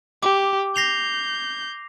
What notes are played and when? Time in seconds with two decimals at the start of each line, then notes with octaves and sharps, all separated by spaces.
0.23 G4 D6
0.76 G6 A#6 C7 F7